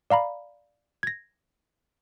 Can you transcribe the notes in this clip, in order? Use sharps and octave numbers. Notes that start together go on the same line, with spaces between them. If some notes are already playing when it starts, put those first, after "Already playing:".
D5 F5 A#5 B5
G#6 A#6